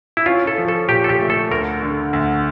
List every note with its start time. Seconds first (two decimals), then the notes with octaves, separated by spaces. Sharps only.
0.17 E4
0.26 C#4 F4
0.47 A4
0.58 F3
0.68 A4
0.89 A#2 G4
1.04 A4
1.09 G4
1.20 A3
1.30 A4
1.51 D2 A#4
1.82 D3
2.13 D2